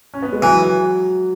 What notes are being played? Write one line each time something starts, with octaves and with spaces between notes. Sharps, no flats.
C#4
B3
G#3
E3 F#3